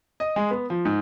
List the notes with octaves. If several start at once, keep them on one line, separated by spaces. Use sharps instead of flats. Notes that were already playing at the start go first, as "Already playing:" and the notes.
D#5
G#3
B3
F3
G#2